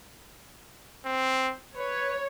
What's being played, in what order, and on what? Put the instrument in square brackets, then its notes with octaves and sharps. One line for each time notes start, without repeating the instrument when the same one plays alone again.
[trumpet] C4
[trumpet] B4 [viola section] C#5